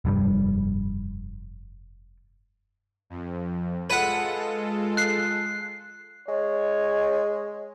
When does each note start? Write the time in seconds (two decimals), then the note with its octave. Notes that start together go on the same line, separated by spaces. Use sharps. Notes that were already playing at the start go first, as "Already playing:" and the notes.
0.05 F1 G2 G3
3.10 F2
3.90 G#3 F4 A4 B4 F#5
4.97 F#6 C7
6.28 G#3 C#5